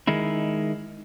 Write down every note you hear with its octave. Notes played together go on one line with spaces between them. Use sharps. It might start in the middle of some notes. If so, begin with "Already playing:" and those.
D#3 G#3 D#4 E4